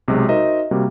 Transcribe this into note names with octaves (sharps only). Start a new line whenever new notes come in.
B1 C3 F#3 G#3
D#4 F#4 A#4 C5 D#5 E5
C3 G3 A#3 F#4